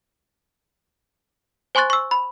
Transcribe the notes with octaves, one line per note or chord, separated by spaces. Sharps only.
C5 G#5 C6 C#6 F#6 A6
C#6 E6
B5